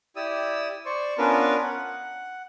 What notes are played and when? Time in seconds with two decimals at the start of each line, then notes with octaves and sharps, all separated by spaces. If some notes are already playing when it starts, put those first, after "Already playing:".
0.16 E4 G4 D5 D#6 E6
0.85 C5 D5 C#6
1.18 B3 C#4 D4 F4 A#4 B4
1.64 F#5